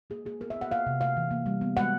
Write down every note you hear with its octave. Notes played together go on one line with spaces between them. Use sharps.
A#3 G#4
A#3 G#4
B3 A#4
E5
B3
F#5
A#3 F5
C3
A3 F5
E3
A#3
G3
B3
G#3 F#5